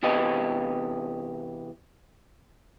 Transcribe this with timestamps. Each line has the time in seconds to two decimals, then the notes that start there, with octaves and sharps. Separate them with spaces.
0.03 E2 C3 G4 B4 D#5